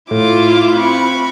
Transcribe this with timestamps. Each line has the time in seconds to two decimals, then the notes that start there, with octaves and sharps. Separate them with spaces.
0.11 A2 E4 F4 D6
0.74 C4 B5 C#6 F#6